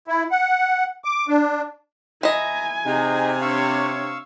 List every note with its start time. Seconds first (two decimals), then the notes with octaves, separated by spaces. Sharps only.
0.08 E4
0.31 F#5
1.04 D6
1.28 D4
2.23 E3 D#5 G#5 A#5
2.86 C3 D#4 G#4
3.42 D4 C#5 F5 C#6 E6